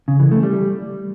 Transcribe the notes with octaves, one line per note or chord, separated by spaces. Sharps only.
C#3
E3
A3
G3